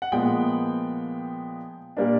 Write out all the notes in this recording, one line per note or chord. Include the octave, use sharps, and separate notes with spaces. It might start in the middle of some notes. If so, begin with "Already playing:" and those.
F#5
A#2 F3 G#3 B3 G5
A#2 G3 A#3 D4